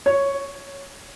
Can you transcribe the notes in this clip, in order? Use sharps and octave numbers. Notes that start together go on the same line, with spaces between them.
C#5